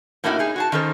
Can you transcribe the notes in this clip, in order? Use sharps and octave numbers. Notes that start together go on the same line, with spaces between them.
A2 A#3 C#4 D#4 E4 F#4
D#4 G#4
F#4 G#4 A5
D#3 C#4 D#4 A4 A#4 C5